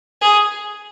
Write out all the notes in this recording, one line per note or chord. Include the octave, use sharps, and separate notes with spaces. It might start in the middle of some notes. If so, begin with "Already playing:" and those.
G#4